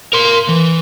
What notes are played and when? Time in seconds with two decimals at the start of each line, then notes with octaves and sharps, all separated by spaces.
0.13 A#4 C6
0.49 E3